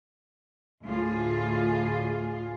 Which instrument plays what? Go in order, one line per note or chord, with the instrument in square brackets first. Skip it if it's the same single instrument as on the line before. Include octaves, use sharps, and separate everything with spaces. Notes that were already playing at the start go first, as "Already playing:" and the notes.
[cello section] D2 A2 F4 G#4